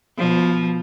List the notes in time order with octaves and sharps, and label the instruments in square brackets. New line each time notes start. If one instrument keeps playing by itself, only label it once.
[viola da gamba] B2 F3